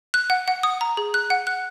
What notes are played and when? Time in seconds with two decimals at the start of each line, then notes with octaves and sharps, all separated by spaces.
0.14 F#6
0.30 F#5
0.48 F#5
0.63 D#6
0.81 A#5
0.97 G#4
1.14 F#6
1.30 F#5
1.47 F#6